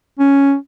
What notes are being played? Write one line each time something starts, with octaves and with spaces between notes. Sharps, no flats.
C#4